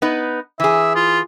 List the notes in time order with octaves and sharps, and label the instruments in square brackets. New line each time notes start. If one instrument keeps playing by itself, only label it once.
[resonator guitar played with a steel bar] B3 D#4 B4
[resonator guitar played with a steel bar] E3 G#4 [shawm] E5
[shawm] F4